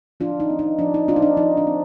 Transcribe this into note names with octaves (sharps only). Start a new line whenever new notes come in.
F3 D4 F4
D#4
C4
D#4
F3 D4
D#4
C4 D4 F4
D#4
D4
F3 D#4
D4
C4